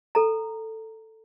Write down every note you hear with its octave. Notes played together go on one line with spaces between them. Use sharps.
A4 A#5